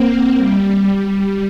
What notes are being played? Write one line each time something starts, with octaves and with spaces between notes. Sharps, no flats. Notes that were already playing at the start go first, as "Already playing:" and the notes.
Already playing: A#3 C4
G3
G3